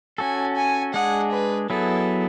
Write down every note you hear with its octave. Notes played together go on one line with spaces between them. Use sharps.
C#4 F#4 A4 G#5
G#5
G#3 D4 G#4 F#5
B4
F#3 B3 E4 G#4 A4